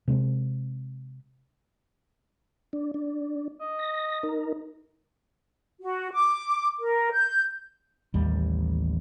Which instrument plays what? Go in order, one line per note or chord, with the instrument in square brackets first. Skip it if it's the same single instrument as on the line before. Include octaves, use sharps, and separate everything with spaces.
[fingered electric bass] C3 G#3 A3 C4
[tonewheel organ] D4
D4
[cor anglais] D#5
[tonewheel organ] A#6
D#4 A#4
[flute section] F#4
D6
A#4
G6
[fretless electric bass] A1 D#2 G3